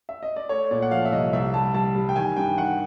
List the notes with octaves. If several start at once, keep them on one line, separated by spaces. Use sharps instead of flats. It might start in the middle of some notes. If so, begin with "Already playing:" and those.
E5
D#5
D5
A3 C#5
A#2 D5
F#5
F3 F5
E5
C2 D#5
C2 E5
G3 A5
G3 A5
G3
G5
D#3 G#5
G2 G5
D#3 F#5